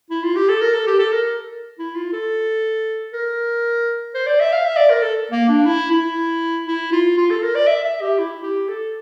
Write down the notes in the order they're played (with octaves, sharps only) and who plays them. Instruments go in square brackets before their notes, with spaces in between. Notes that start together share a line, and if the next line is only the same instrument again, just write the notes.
[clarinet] E4
F4
G4
A4
A#4
A4
G4
A4
A#4
E4
F4
A4
A#4
C5
D5
E5
F5
E5
D5
A#4
A4
A#3
D4
E4
E4
E4
F4
F4
A4
A#4
D5
E5
E5
G4
E4
G4
A4